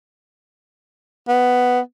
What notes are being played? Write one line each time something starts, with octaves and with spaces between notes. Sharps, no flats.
B3